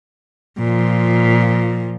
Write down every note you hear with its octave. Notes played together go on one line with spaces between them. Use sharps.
A#2 F3